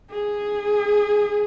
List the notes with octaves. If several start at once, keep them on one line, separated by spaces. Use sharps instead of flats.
G#4